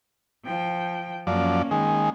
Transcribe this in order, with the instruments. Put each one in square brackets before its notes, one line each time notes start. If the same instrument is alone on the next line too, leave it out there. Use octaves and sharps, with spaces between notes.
[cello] F3 G5
[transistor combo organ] F#2 F3 D5 [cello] A#3 C#4
[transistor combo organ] D#3 G#3